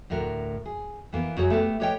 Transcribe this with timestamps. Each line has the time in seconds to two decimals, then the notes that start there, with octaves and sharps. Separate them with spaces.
0.10 D2 A2 A3 A#4 F#5
0.66 G#4
1.13 E3 A#3 B3
1.37 F#2 F#4 G#4 C#5 F#5
1.50 A3 B3 G4
1.80 G4 B4 C#5 D#5 G5